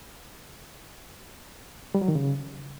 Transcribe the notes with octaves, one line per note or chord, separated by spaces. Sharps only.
G3
F#3
D#3
C#3